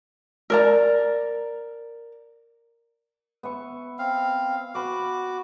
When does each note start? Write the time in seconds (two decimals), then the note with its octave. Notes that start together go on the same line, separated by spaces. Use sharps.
0.50 A#4 D5 A#5
3.43 B3 E5 C#6
3.99 C4 F5
4.75 B3 F#4 B5 D6